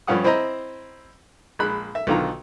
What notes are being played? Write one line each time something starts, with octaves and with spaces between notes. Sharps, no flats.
G2 F3 C#4 F5 F#5 D#6
C4 E4 C5 D#5 A#5
A#1 G#3 B5 F#6
E5
B1 D3 D#3 F4 A#5